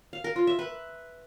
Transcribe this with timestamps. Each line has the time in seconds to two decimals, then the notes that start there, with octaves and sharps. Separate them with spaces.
0.13 F5
0.24 A#4
0.36 F4
0.47 E5
0.59 B4